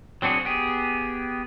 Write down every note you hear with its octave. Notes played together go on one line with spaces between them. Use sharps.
F#3 C4 D4 F#4 G#4
B3 G4 G#4